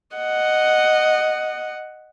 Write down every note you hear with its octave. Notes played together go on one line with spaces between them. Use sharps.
D#5 F#5